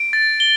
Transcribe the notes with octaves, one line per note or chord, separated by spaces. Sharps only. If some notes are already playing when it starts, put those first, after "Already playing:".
Already playing: D7
A6
G7